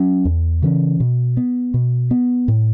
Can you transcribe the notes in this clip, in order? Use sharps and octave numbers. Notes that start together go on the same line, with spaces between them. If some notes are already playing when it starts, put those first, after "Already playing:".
Already playing: F#3 C#4
E2
C#3 E3 C#4
B2
B3
B2
B3
A2